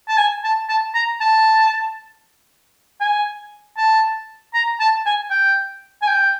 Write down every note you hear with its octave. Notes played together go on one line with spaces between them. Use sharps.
A5
G#5
A5
A5
A#5
A5
G#5
A5
A#5
A5
G#5
G5
G#5
G5